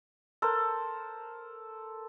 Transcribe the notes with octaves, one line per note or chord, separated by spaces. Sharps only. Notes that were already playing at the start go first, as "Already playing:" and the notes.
A4 A#4 C5